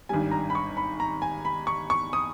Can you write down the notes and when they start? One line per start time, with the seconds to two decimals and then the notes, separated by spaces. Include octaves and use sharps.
0.09 G#1 G2 G3 G#5
0.31 A#5
0.50 B5
0.55 C#6
0.77 B5
1.00 A#5
1.22 G#5
1.45 B5
1.67 C#6
1.90 C#6
2.13 D#6